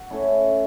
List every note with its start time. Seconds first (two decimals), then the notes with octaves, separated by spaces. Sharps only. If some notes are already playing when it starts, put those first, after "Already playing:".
Already playing: F#4
0.10 A3 C#4 E4 A4